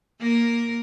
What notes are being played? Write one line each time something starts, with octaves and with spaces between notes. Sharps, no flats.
A#3 A#4